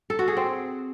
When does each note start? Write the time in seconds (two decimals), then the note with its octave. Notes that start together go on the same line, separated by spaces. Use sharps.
0.10 A4
0.19 F#4
0.28 G#4
0.37 C4